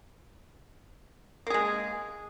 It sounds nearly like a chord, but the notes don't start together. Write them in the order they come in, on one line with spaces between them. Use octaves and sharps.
A#3 G#4 G#3